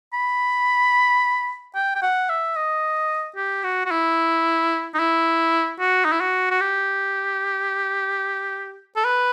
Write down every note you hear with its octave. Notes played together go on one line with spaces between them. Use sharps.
B5
G5
G5
F#5
E5
D#5
G4
F#4
F#4
E4
D#4
E4
F#4
D#4
E4
F#4
F#4
G4
A4
B4